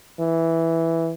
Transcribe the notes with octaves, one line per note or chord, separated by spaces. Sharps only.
E3